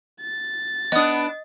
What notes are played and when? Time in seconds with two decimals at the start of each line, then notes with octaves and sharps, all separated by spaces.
0.21 A6
0.92 B3 D4 D#5 D#6